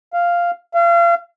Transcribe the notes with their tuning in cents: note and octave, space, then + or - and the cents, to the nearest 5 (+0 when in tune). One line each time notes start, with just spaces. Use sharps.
F5 -5
F5 -35